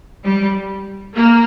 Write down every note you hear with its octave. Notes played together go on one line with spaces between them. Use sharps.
G3
A#3